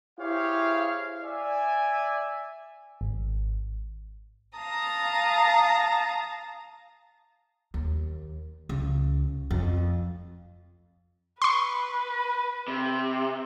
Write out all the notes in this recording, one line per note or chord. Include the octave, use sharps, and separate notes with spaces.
E4 G4 G#4 C5 C#5 F5
D5 E5 G#5
G#1
F5 A5 A#5 D#6
D#2
C#2
F2
B4 C6 C#6
C3